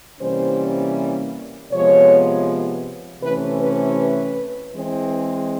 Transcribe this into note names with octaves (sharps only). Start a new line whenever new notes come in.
C3 E3 G3 A#3 C#4 C5
C3 F3 G#3 B3 C#5
C3 E3 A3 C#4 B4
B4
B4
E3 G#3 C4